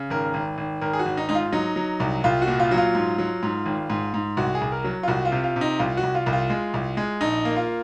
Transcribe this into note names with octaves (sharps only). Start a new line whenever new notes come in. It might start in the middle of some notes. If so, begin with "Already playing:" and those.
Already playing: C#3
G#1 A#4
G#1
G#1
G#1 A#4
G#4
F#4
G#1
D#4
G#2 D#4
F4
F#3 D#4
F#3
C2
C2 F4
F#4
A#2
F4
F#3
F4
G#2
F#3
G#2
G#1
G#2
G#2
C2 F#4
G#4
C2
A#4
F#3
F4
C2 F#4
F4
C3
F4
C3
D#4
C2 F4
F#4
C2
F4
C2
F4
G#3
C2
G#3
A#1 D#4
A#3
F4